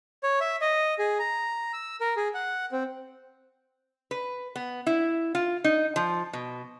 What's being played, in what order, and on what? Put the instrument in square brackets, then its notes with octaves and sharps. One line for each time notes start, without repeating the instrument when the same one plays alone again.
[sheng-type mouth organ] C#5
E5
D#5
G#4
A#5
E6
A#4
G#4
F#5
C4
[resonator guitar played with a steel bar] B4
B3
E4
F4
D#4
F3
B2